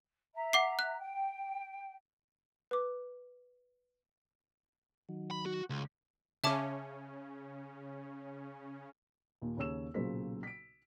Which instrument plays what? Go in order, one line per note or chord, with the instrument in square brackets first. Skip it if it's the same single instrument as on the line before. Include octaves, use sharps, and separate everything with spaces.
[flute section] E5 A#5
[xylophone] F#5 D6 C7
F#6
[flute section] G5
[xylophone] B4 D6
[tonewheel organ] D#3 F#3
[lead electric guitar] B5
F#4
C#2
[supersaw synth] C#3 C#4 [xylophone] E5 A5 D6
[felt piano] D#2 A#2
D#2 C#3 C#5 E6 E7
B1 A#2 C#3 F#3 C5 B6
B6 D7